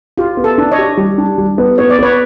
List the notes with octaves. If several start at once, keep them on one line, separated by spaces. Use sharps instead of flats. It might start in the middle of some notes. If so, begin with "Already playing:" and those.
F4 G4
B3
A4
D4
C#5 D#5
G4
G3
D4
G3
B3
B3 C#5
D5
B3 B4 C#5